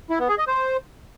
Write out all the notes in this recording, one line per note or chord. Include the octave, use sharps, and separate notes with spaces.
E4
B3
G#4
D#5
C5